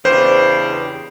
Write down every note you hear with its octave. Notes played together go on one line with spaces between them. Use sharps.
E2 C#3 D4 G4 B4 C5